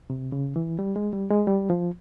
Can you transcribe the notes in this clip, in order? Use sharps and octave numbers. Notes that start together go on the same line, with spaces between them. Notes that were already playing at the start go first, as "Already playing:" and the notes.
C3
C#3
E3
G3
G#3
G3
G#3
G3
F3